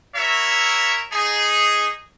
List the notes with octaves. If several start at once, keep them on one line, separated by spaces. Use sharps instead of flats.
E4 F#4 A#4 C#5 E5
D#4 G#4